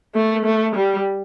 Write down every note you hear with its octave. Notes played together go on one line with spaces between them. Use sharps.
A3
A3
G3